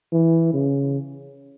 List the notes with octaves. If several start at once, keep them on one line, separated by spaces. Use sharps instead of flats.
E3
C#3